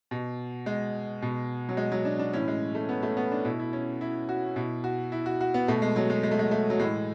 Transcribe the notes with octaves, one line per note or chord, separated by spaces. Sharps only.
B2
G#3
B2
F#3
G#3
F#3
D4
D4
A2 E3 C#4
G#3
A3
B3
A3
B3
D4
B2 E4
E4
C#4
E4
F#4
B2 E4
F#4
E4
F#4
F#4
B3
B2 A3
G#3
F#3
G#3
G#3
A3
G#3
A3
F#3
A2 E3 G#3